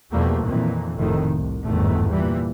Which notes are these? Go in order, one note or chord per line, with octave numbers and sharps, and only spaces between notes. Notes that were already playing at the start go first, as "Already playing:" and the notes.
E2 B2 F3 G3 A3 A#3
F2 A#2 D#3 E3
F1 F2 A2 D#3
C2
G1 E2 G#2 D#3 A3
A#2 E3 G3